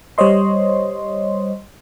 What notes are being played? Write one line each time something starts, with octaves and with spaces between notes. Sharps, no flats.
G3 C5 C#5 D#5 C6